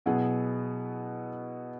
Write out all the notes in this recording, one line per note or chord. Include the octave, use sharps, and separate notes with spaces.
B2 F#3 B3 E4 G#4